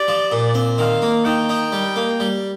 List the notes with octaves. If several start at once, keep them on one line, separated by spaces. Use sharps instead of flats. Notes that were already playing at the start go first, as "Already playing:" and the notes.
Already playing: G4 D5
F3
A#2
C4
D#3 F5
A#3
D#3 G5
D#4
G3
A#3
G3